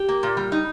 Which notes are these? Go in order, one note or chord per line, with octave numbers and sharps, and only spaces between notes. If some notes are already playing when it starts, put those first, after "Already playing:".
Already playing: G4
A#3
A#2
G3
D#4